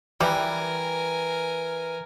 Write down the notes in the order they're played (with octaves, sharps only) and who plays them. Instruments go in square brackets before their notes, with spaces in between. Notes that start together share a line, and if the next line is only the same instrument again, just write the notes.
[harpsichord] E3 [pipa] G3 [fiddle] A#4 G#5